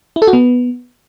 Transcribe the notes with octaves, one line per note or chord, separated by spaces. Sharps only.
E4
A4
F#4
B3